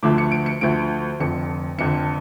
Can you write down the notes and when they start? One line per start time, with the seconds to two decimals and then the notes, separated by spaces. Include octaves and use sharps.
0.03 D2 D3 F3 A3 D6
0.18 C#7
0.32 D7
0.46 C#7
0.61 D2 D3 F3 A3 D7
1.20 F1 F2 D3 C#7
1.78 F1 F2 D3 C#7